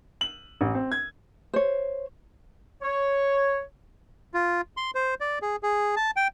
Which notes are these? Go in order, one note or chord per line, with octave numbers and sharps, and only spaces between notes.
F#7
A1
C4
G#6
C5 C#5
C#5
F4
C6
C5
D5
G#4
G#4
A5
G5